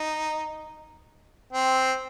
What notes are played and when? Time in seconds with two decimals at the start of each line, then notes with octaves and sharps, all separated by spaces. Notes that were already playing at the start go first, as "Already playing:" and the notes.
Already playing: D#4
1.53 C4